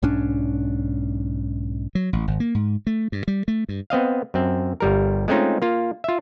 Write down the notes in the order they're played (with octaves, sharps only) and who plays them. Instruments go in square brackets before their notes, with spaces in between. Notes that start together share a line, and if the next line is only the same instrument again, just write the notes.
[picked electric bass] B1 G#2 C#4 D4
[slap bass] F#3
A1
G#1
A#3
G#2
A3
G2
G3
A3
G2
[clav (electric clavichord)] B3 C4 D#5 F5
F#2 C4
G1 G3 A#4
G#3 A3 C4 C#4 D#4 F4
A#3 F4
F4 E5